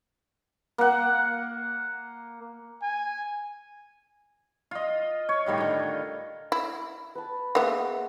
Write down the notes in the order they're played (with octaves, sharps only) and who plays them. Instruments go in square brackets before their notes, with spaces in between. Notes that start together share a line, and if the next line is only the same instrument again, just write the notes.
[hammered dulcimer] A#3 F#5
[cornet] G#5
[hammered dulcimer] F4 D#5
C#5
A2 D#3 G3 F5
D3 D#3
[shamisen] E4
[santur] B4 A5
[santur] G#3 E5 C6 [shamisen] A#3 B3